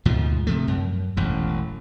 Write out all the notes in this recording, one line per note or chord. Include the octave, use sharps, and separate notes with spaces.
D2 G#2 B2 F3
C3 F3 A3
F#2
E1 A1 F#2